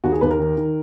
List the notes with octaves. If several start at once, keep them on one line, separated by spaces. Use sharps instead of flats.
D#2 F#4
G#4
D#2 B4
A#4
D#3
D#3